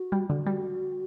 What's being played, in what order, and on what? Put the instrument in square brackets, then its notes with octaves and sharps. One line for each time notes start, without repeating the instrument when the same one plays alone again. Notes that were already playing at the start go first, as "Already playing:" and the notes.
Already playing: [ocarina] F#4
[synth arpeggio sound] G3
[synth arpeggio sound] D3 [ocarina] F#4
[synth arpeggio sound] G3